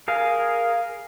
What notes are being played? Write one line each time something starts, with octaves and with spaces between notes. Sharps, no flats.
G#4 A#4 F5